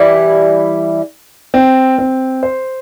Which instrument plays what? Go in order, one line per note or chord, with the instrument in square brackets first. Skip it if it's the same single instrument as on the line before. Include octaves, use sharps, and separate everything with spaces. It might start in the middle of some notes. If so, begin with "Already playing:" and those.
Already playing: [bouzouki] E3 G3 E4
[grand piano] C4
C4
C5